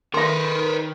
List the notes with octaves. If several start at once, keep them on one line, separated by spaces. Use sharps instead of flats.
D#3 A#4 B4 E5 C6